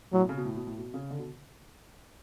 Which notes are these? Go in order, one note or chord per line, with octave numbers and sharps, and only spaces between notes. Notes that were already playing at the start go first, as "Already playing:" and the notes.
A2 F#3
B2
C#3
B2
A2
B2
A2
B2
C#3
D3
B2